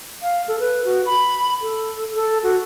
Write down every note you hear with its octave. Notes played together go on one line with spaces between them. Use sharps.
F5
A4
B4
F#4
B5
A4
A4
F#4